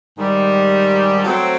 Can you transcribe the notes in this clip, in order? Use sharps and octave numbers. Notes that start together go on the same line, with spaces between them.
G#2 D#3 G3
F#3 A3 C4